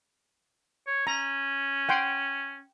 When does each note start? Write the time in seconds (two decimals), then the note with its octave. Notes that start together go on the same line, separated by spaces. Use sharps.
0.87 C#5
1.07 C#4 A#5
1.89 F#5 G5 C6